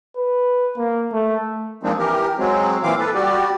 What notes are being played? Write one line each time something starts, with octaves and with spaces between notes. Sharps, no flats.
B4
A#3
A3
F3 G#3 A#3 C4 D4 D#4
E3 G4 A#4
F#3 G#3 C4
A#2 E3 C4 F5 D6
A4 B4
G3 F#4 G4 D5